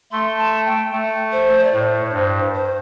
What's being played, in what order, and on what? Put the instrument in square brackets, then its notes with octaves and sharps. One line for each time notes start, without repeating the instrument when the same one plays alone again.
[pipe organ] A3 [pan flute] C6
[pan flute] A5
G5
[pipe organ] A3
[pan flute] C5
D5
[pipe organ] A2 [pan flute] C5
[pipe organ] G2
[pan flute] C5